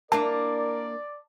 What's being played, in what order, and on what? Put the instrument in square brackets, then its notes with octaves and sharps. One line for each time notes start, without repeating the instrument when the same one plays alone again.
[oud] A#3 D4 E4 [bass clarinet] A#4 [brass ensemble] D5 [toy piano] A5